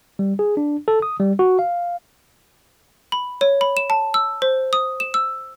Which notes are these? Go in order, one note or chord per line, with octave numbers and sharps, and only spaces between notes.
G3
G#4
D4
A4
D#6
G3
F#4
F5
B5
C#5
B5
E7
A5
E6
C5
D#6
E7
E6